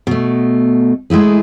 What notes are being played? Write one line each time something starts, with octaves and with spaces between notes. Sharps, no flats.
B2 A3
G#3 A3 E4 G#4